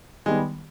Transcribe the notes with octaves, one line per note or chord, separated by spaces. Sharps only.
D#3 G3 G#3 B3